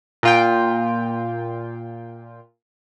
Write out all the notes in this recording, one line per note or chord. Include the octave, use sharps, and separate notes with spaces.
A#2 F4 G5